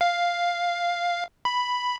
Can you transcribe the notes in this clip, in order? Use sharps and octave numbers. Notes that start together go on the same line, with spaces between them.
F5
B5